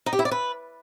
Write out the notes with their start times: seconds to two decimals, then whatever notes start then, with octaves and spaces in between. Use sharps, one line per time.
0.06 D#4
0.13 G4
0.19 E4
0.25 D5
0.31 B4